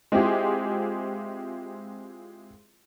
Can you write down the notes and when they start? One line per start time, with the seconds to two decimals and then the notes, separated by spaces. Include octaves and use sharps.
0.12 G#3 C4 E4 F4 G4 G#4